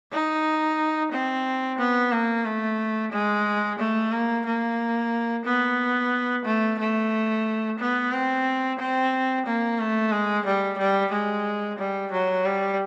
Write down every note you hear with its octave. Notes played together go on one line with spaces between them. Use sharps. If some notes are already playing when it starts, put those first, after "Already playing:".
D#4
C4
B3
A#3
A3
G#3
A3
A#3
A#3
B3
A3
A3
B3
C4
C4
A#3
A3
G#3
G3
G3
G#3
G3
F#3
G3